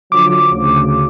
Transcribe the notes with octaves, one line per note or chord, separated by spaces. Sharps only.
D3 F3 F#3 D6
D2 C#3